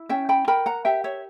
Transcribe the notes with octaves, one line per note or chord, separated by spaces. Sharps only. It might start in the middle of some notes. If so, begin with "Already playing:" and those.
Already playing: E4
C#4 E5 G5
G5 B5
A#4 G5 B5
F#5 A#5
G4 E5 G5
C#5 E5